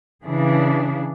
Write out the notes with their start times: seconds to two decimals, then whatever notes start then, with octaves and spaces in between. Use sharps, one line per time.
0.24 C#3 E3 D4 G#4